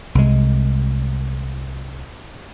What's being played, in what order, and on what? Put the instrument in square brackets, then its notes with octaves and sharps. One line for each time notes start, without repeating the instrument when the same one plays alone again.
[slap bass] C2 G#3